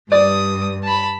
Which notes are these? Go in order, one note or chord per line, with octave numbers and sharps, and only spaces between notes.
G2 D5 D#6
A5 B5